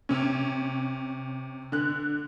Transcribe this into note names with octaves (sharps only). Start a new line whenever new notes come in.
C3 C#4
D3 F#6